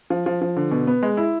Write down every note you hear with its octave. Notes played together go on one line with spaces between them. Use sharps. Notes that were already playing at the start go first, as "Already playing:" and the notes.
F3
F3
F3
D3
B2
B3
G#3
E4